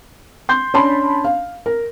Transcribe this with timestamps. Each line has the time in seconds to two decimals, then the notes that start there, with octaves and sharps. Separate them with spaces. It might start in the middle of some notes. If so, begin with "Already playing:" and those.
0.49 C6 G6
0.74 C#4 D4 A5 B5 C6
1.24 F5
1.66 A#4